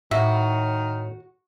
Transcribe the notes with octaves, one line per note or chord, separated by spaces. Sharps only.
A2 D#3 F#4 E5